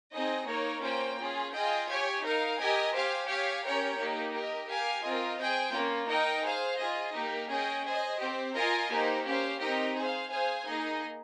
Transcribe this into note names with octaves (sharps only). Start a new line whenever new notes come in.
C4 D#4 G#4 D#5
A#3 D#4 A#4 C#5
A#3 C#4 F4 C5 G5
C#4 F4 G#4
F4 G#4 D#5 G5
G4 C#5 G#5
D#4 A#4 F5
G4 A#4 D#5 G#5
G4 C5 F5 G#5
G4 C#5 F5 G#5
C#4 G4 A#4 C#5 G5
A#3 D#4 G4
G4 A#4 D#5
G4 A#4 F5 G#5
C4 F4 A#4 D#5
G#4 C5 G5
A#3 C#4 F4
D#4 A#4 D#5 G5
G#4 C5 F5
F4 G#4 D#5
A#3 D#4 G4 A#4
C#4 G#4 D#5 G5
G#4 C5 D#5
C4 G4 C5
F4 A#4 D#5 G#5
A#3 D#4 G4 C5
C#4 G4 C5 F5
C4 D#4 G4 A#4 D#5
G#4 C5 F5
G#4 C5 F5 G#5
A#3 D#4 G#4 D#5